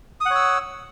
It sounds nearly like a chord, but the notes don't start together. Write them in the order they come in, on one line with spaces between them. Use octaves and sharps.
D#6 F#5 C#5 E6